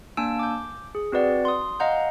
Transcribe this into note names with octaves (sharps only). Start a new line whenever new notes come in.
A#3 D4 G#5 A5 E6 D7
D6 G6
G#4
C4 F#4 B4 D5 F#5
C6 D#6
D#5 F5 F#5 A#5 G6